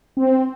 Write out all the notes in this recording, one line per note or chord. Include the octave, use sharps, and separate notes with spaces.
C4